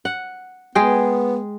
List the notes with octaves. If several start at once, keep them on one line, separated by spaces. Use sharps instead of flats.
F#5
G#3 B3 G#4 G5